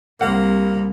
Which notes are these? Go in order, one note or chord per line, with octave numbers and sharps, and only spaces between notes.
C2 A#3 F#5